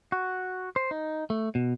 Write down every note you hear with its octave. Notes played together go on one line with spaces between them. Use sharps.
F#4
C5
D#4
A3
B2